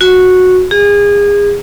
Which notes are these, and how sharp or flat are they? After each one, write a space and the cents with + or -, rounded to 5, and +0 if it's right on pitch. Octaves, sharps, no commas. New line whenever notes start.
F#4 -10
G#4 -30